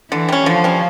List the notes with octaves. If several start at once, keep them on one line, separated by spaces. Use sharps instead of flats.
D3 E3
G3 C#4
D3 F3
G3 C#4